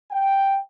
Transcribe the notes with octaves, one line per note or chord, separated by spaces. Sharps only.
G5